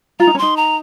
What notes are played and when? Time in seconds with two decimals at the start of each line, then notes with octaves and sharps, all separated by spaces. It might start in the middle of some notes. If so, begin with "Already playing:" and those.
0.20 F4 A#5
0.27 D#4
0.35 C#4
0.38 D#4 C6
0.57 A#5